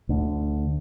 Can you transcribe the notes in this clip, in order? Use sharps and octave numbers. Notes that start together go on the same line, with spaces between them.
D2 D3